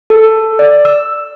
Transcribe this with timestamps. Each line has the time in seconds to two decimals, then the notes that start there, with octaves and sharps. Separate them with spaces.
0.10 A4
0.59 D5
0.85 E6